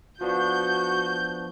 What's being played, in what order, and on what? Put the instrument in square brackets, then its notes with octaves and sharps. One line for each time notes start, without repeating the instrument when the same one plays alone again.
[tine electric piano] F3 B3 D4 [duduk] F#4 [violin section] G6